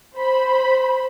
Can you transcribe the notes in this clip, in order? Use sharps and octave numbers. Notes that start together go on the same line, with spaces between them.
C5 B5